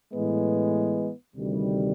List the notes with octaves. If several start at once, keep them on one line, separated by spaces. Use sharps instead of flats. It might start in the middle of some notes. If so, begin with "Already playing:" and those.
A2 E3 G#3 B3
D2 C3 D#3 G3